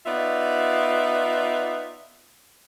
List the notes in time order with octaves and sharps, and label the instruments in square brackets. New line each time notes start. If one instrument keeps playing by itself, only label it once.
[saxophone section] B3 D#4 F4 D5 E5